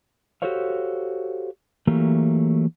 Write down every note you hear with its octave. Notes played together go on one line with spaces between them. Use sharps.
F#4 G4 A4 C5 C#5 F5
E3 F#3 A3 A#3 G4